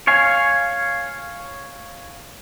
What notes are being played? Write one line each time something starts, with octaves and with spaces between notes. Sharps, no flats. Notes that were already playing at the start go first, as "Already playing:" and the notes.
C#5 F5 G#5